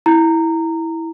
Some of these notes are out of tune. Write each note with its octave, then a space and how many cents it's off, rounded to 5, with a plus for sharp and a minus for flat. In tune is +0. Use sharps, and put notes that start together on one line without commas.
E4 -10 A#5 -15